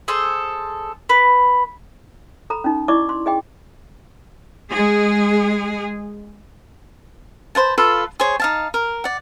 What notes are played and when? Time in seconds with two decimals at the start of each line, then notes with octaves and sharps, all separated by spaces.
0.08 G#4 A4 C5
1.09 B4
2.50 A4 A#5 B5
2.64 C#4 D#4
2.88 E4 D5 D#5 C#6 D6
3.09 C6
3.26 G#4 D#5 G5
4.70 G#3 G#4
7.55 B4 C5 F#5 A5
7.78 F4 A4 B4 F5
8.20 G#4 C5 C#5
8.40 D#4 F5 A5
8.74 A#4
9.04 D5 F#5